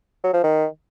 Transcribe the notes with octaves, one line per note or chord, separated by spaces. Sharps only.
F#3
F3
D#3